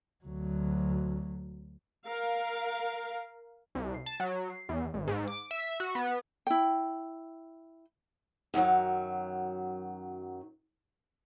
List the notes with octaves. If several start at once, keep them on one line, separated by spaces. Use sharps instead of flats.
D2 F#3
A#4 F5
C2
C7
A5
F#3
C7
E2
G#1
G#2
D6
E5
F#4
B3
E4 G5
F#2 D#3 F3 F#3